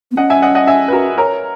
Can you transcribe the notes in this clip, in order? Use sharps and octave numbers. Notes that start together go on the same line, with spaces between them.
B3
C#4 D#5 F#5
E5 G#5
D#5 F#5
D#5 F#5
E5 G#5
B4
F#4 A#4
A#4 C#5